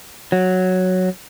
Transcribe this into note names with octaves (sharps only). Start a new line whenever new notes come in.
F#3